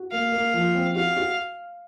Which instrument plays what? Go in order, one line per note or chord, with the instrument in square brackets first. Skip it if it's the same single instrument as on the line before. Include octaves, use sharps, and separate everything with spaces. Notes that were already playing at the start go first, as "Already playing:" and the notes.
Already playing: [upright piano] F#4
[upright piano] A#3 [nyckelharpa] F5
[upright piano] A#3
F3
C4
[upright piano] F#4 [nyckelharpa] F5
[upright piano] F#4